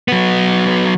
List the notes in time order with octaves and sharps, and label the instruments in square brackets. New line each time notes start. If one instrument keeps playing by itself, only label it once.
[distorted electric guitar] F#3 B3